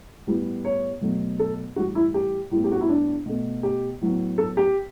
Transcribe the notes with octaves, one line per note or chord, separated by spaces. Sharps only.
A2 G3 B3
C#5
B2 F#3 A3
A4
A2 E3 G3 F#4
E4
G4
A2 G3 B3
G4
F#4
E4
D4
B2 A3
G4
A2 F#3 B3
A4
G4